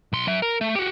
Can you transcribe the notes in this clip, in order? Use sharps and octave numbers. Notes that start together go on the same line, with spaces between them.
B1 C6
F#3 E5
A#4
A3
F#4 G4